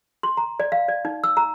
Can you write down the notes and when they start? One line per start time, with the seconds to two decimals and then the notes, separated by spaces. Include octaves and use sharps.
0.23 C6
0.37 A#5
0.60 D5
0.72 F5
0.88 D5
1.05 D#4
1.24 E6
1.37 A#5